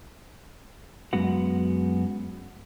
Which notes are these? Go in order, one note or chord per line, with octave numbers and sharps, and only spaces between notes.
F#2 G#3 B3 F#4 F#5